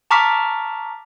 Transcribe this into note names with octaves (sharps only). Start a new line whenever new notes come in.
A5 A#5 C#6 D6 F6 B6